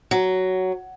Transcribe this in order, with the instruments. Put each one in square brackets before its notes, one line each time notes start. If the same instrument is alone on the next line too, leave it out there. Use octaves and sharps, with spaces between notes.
[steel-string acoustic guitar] F#3